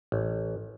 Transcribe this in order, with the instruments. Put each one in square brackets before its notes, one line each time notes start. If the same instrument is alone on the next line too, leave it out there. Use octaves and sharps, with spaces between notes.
[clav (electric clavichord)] A1